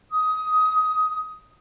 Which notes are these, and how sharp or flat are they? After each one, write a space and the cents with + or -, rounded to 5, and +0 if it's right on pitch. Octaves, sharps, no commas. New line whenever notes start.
D#6 +15